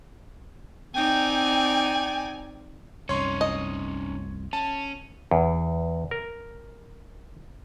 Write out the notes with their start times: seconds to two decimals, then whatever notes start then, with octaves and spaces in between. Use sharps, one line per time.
0.94 C4 D#4 D5 G5 G#5
3.09 C2 F#2 C#4 D#4 C#5 C6
3.41 D#5
4.53 C#4 A5
5.31 E2
6.11 A#4